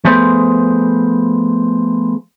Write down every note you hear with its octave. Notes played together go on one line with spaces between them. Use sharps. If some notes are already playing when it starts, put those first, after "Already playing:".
F3 A3 B3 G#4 C5